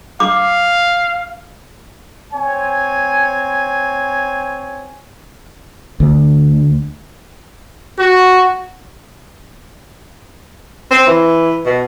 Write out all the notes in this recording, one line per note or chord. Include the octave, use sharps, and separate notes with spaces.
F5 D6
C4 C#5 G#5
D2
F#4
C4
E3
B2